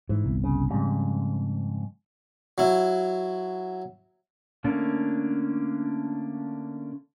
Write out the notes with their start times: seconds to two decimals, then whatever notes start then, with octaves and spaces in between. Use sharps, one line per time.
0.09 G#2 E3
0.25 G1 C2
0.44 C#3
0.70 F2 G#2 C#3 G3
2.58 F#3 E4
4.64 D3 A3 A#3 C#4 D4